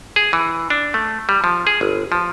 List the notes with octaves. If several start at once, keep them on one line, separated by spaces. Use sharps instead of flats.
G#4
E3
D4
A3
G3
F3
G#4
G1
F3